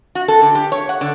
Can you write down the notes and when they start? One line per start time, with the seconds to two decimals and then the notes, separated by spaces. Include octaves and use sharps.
0.15 F#4
0.28 A4
0.42 D3
0.55 G4
0.72 C#5
0.89 F#5
1.01 D3